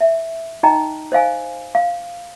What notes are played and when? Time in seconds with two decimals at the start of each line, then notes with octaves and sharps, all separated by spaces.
0.01 E5
0.63 D#4 D#5 G5 A#5
1.12 C5 D#5 F5 G#5
1.75 F5